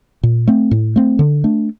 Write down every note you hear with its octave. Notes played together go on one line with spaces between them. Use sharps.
A#2
A3 C4
A2
A3 C4
D3
A3 D4